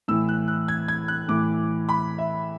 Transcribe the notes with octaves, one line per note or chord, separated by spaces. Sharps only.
A2 E3 E6
F#6
F#6
G#6
G#6
F#6
A2 E3 D6
B5
E5